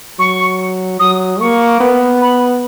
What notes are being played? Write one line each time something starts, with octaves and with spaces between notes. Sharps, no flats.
F#3 C#6
F#3 D#6
A#3 C#6
B3
B5